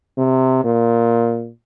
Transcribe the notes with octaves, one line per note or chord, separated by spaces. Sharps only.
C3
A#2